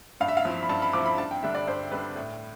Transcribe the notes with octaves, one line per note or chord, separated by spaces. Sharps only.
G2 F5
E5
F5
F3 C4 E4
B5
G2 A5
B5
F3 C4 E4 D6
B5
G2 A5
G5
D3 G3 D4 E5
D5
G2 C5
D3 G3 D4 B4
A2